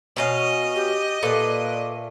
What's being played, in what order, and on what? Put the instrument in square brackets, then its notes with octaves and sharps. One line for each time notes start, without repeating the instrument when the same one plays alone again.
[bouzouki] B2 C#4 F5 [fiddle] D#5
[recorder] G4
[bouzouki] A#2 A3 [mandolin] A4 D5 F5 [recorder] B4